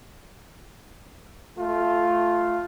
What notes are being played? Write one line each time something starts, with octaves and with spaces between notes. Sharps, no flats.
A3 F4